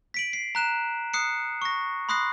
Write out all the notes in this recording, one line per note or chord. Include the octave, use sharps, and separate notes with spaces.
B6 D7 F#7
C7
A#5 F#6 E7
D#6 F#6 C7 C#7
C#6 A#6
B5 C6 D#6 F#6 A#6 C7